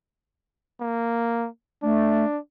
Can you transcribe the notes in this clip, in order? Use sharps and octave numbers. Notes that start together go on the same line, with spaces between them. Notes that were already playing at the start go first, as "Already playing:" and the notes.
A#3
A3 D4